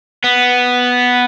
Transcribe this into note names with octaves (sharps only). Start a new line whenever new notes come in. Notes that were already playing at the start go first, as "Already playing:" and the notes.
B3